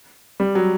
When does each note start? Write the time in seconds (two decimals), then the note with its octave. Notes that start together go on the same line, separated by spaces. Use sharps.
0.40 G3
0.55 F#3